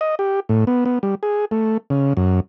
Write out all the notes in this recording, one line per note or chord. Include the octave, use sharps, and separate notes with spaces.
D#5
G4
A2
B3
B3
G3
G#4
A3
C#3
F#2